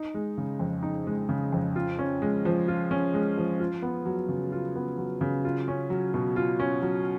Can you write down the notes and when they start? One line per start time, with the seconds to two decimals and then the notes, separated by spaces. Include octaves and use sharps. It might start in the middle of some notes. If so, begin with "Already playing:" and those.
Already playing: D#4
0.14 G#3
0.38 C#3
0.59 F2
0.83 D#4
1.07 G#3
1.29 C#3
1.52 F2
1.76 F4
1.99 C#4
2.22 G#3
2.45 F3
2.68 F4
2.91 C#4
3.14 G#3
3.38 F3
3.60 F4
3.82 B3
4.06 F#3
4.29 C#3
4.52 F4
4.75 B3
4.98 F#3
5.21 C#3
5.45 F4
5.68 C#4
5.90 F#3
6.14 B2
6.36 F4
6.60 C#4
6.82 F#3